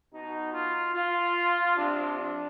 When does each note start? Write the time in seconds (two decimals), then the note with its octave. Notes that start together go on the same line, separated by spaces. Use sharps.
0.14 B2 D#4
0.53 F4
0.94 F4
1.75 C3 F3 D4
2.16 D4